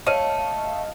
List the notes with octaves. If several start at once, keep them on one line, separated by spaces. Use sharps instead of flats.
A3 C#5 D#5 F5 D#7